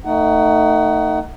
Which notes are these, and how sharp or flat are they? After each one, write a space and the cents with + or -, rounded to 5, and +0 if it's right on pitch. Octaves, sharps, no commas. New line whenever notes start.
A3 +30 D#4 +0 F#5 +25